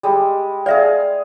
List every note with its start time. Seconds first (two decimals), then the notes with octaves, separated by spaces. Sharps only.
0.03 G3 G#3
0.66 G#4 D5 E5 F5